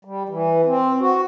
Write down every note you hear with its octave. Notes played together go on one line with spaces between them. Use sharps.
G3
E3
C4
F#4